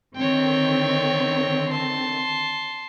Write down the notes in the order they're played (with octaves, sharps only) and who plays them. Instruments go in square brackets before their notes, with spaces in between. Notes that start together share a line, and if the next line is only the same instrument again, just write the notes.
[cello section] D3 D#3 C4 [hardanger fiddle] C#5 G5
[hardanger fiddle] A5 C6